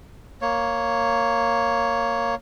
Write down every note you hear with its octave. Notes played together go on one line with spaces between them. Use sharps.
A#3 C#5